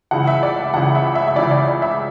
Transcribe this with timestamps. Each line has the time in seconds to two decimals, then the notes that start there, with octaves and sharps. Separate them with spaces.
0.11 C#2 C#3 E3 F#5
0.27 E5
0.43 D5
0.58 E5
0.73 C#2 C#3 E3 F#5
0.95 E5
1.15 E5
1.28 E5
1.35 C#2 C#3 E3 D5
1.51 D5
1.67 D5
1.82 E5